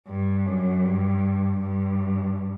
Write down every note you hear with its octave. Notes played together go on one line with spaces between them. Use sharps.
G2
F#2
G2
G2